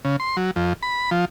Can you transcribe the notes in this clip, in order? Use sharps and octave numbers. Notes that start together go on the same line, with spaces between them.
C#3
C6
F#3
F2
B5
F3